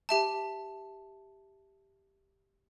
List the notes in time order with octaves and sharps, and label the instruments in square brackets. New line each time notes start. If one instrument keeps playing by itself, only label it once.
[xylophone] G4 E5 A5